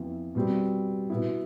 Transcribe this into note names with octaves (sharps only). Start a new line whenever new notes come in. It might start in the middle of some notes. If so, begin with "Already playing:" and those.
Already playing: F2 E3 B3 E4
B2 G3 C4
B2 B3 E4